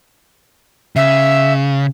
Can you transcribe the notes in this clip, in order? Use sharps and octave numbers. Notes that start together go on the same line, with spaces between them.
C#3 E5